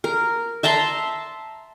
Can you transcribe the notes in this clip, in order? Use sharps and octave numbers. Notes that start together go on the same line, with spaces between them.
A#4
E5 A5 A#5 C6